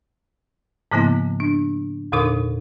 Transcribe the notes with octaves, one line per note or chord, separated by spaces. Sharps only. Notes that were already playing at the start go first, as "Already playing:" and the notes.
G#2 C#3 F3 A#3 B3 E4
D4
E2 A#2 D3 D#4 A#4 D6